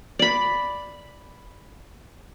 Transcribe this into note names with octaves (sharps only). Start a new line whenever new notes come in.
D5 B5